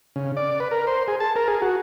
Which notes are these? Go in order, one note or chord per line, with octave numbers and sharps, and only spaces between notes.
C#3
D5
B4
A#4
C5
G#4
A5
A#4
G#4
F#4